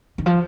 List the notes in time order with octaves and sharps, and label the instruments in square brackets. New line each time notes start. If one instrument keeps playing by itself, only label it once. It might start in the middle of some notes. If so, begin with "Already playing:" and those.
[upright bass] D#3
F3